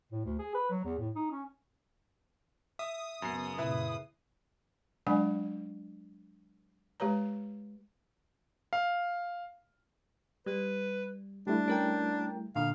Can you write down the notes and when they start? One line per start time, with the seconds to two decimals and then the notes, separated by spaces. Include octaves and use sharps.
0.12 A2
0.25 D2
0.39 G#4
0.55 B4
0.71 F#3
0.85 E2
0.99 A2
1.15 D#4
1.32 C#4
2.79 E5 D#6
3.22 F#2 C#3 B3 C7
3.58 F#2 A#2 C#3 E4 B4 E5
5.07 F#3 G#3 D4 D5 F#5 G#5
7.00 G#3 G4 B4 C#5 A#5
8.73 F5
10.46 G3 B4
11.47 G3 A3 D4 E4
11.68 C#4 A#4 G5
12.56 A#2 D3 F5